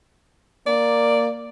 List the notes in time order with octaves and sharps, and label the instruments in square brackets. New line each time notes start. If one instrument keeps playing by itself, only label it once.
[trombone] A#3 [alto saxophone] D5